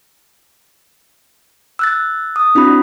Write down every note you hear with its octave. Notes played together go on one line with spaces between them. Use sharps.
E6 F#6 A6
D#6
C4 D4 E4 F#4 B5